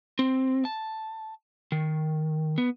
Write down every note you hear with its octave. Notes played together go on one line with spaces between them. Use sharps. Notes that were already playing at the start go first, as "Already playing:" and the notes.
C4
A5
D#3
B3